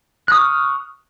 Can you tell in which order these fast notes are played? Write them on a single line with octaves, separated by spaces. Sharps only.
F#6 D#6 C#6 F6